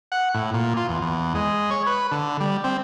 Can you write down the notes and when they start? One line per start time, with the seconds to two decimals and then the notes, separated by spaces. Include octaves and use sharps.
0.12 F#5
0.34 A2
0.54 A#2
0.77 F4
0.89 E2
1.02 E2
1.35 G#3
1.71 C#5
1.87 B4
2.11 D3
2.40 G3
2.64 C4